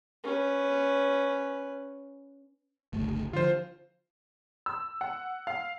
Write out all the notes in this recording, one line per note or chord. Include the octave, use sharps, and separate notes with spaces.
C#4 B4
G1 C#2 A3
D3 F3 F4 C5
E6
F#5
F5